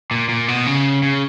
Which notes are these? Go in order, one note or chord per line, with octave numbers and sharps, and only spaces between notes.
A#2
A#2
B2
C#3
C#3